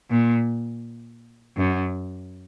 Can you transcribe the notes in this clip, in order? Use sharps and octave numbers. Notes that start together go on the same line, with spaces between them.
A#2
F#2